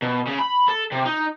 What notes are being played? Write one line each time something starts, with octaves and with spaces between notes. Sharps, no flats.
B2
C#3
B5
A4
C3
D#4